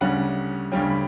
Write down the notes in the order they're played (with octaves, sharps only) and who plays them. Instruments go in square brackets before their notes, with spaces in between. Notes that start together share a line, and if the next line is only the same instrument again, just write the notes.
[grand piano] D2 C#3 G3 C#4 F#5
D2 C#3 G3 C#4 G5
B5